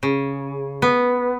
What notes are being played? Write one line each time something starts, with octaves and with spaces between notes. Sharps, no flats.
C#3
B3